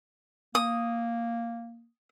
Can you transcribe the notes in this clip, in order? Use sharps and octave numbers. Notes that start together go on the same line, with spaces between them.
A#3 D#6